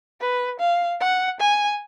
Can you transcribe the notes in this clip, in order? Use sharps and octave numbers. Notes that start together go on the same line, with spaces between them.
B4
F5
F#5
G#5